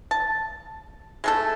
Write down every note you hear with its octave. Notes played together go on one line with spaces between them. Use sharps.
A5
G#3 A3 A4